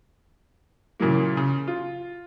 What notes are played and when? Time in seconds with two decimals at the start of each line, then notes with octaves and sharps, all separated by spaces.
1.00 A#2 C#3 E3 F#3 A#3
1.37 C#3
1.67 F4